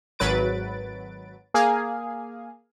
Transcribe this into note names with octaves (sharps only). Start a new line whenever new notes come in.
G#1 F#3 B4 A6 D7
A#3 G#4 F5 G#5